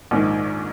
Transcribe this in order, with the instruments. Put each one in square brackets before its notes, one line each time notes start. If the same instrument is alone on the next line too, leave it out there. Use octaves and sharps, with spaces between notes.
[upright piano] A#1 G#2 D#3